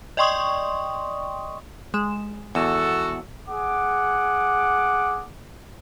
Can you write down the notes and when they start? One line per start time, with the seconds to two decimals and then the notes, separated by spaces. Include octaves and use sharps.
0.17 D5 D#5 G5 C6 C#6 D#6
1.94 G#3 E7
2.55 E2 F#4 A4
3.49 G#4 F#5 D6